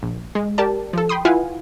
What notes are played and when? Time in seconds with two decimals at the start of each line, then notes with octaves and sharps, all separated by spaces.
0.03 A#1
0.35 G#3
0.58 G4 A#4 D5 A5
0.93 F3 A4
1.09 G5 B5 C6 D#6
1.25 E4 F4 B4 F5 F#5 G#5